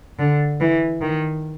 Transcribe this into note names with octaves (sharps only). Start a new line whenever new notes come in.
D3
E3
D#3